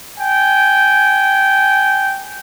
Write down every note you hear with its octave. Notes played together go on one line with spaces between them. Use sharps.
G5 G#5